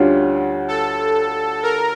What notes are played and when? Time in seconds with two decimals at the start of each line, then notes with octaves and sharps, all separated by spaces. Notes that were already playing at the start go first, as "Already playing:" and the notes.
Already playing: D2 D3 G3 C#4 F4
0.68 A4
1.63 A#4